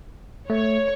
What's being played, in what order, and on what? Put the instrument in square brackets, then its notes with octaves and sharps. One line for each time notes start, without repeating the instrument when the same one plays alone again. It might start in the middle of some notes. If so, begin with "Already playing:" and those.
[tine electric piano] A3 [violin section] C#5